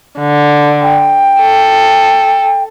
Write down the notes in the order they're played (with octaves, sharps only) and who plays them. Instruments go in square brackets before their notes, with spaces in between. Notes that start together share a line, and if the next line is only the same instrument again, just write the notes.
[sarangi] D3
[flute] G5
[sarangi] A4